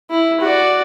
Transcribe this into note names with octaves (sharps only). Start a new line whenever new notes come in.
E4
F#4 D5